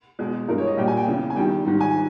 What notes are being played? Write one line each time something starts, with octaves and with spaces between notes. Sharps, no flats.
E2 B2 G#3
G2 E3 G#3 A#4
C#5
D#5
A#2 G3 G5
G#5
G5
E2 C#3 E3
G#5
E2 D#3 G3 G5
G#2 D#3 G3
G#5